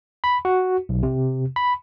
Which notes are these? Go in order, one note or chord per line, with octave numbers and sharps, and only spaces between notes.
B5
F#4
B1
C3
B5